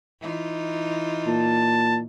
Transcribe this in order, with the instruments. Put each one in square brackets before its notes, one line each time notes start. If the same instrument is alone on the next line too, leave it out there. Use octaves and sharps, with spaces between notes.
[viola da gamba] E3 D#4 F4
[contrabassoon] A#2 [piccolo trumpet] A5